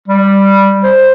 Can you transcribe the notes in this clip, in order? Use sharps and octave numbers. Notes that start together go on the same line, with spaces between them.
G3
C5